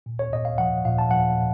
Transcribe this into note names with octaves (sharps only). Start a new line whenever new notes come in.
A#2
C#5
A#2 D#5
F5
F3 F#5
A#2 F5
A5
F3 F#5
A#2